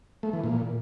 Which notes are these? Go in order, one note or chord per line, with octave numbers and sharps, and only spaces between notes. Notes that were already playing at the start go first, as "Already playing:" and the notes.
A3
E3
A#2